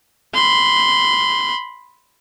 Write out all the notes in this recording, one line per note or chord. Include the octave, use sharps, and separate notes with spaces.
B5 C6